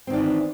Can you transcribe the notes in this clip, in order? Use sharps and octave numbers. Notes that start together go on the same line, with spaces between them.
D#3 E3 C4 D4